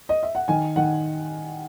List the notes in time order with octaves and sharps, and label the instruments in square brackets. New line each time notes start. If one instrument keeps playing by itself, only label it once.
[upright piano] D#5
E5
F#5
D#3 G#5
D#3 F#5